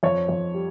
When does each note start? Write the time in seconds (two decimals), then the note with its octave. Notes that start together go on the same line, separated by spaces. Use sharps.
0.03 F2 C#5
0.29 F2
0.54 G3